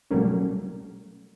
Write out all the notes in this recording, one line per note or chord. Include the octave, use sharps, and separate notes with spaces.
B2 F#3 G3 A3 A#3 C#4